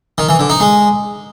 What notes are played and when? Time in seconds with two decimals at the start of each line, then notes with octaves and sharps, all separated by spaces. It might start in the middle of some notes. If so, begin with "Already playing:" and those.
0.18 D#3
0.29 E3
0.39 D3
0.50 D#4
0.60 G#3